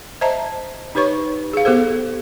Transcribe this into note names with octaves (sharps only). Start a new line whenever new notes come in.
C5 D#5 E5 A5 A#5
D#4 G4 B4 C#5 C#6
G#4 F5
B3 G4 A4 C5